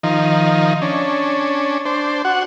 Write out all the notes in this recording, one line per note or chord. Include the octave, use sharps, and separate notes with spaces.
D#3 F3 D#4
C#4 D4
D4 C5
F#4 F#5